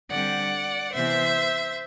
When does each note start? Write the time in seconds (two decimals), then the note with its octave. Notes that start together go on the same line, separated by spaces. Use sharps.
0.10 D3 G3 C4 D5 F#5
0.92 C3 E3 B3 C5 E5